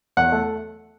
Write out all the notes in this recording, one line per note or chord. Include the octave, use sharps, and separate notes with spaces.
E2 F#5
A3